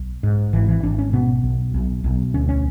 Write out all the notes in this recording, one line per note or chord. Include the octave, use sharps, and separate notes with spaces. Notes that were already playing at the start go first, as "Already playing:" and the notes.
Already playing: B1
G#2
G#1 E3
E3
G#1 D4
C#4
B2 B3
B1
B1
B1
D2 C#4
C#4